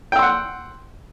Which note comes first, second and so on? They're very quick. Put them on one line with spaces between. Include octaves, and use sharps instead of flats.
G5 E6 C6 F#5